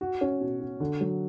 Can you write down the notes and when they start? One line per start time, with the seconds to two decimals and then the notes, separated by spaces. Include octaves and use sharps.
0.01 F#4
0.21 C#4
0.41 B2
0.60 F#4
0.80 D3
1.01 F#3